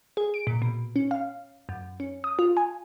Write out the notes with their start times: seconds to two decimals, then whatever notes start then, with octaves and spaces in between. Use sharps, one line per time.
0.17 G#4
0.34 D7
0.47 A#2
0.62 B2
0.96 C#4
1.11 F5
1.69 F#2
2.00 C#4
2.24 D#6
2.39 F4
2.57 G#5